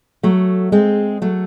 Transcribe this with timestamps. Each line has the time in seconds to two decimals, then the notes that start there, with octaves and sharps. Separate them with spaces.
0.23 F#3 A3
0.72 G#3 C4
1.22 F#3 A3